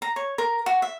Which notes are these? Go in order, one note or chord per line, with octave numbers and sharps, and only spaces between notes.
A#5
C#5
A#4
F#4
E5